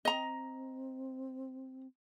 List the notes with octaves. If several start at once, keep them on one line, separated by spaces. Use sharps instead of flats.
C4 D#5 A#5